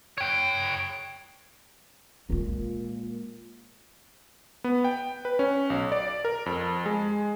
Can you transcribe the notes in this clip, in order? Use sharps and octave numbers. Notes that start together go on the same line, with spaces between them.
C#5 G5
A#2 G#3 F4
B3
G5
B4
C#4
B1
D5
A#4
F2
G#3